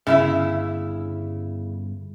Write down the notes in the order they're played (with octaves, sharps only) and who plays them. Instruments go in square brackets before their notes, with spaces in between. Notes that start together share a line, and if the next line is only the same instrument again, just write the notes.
[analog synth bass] G1 [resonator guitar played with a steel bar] C#3 E4 E5